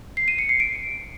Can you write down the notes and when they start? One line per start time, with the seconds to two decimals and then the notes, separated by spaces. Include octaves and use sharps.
0.17 C7
0.28 D#7
0.38 C#7
0.49 C7
0.60 D7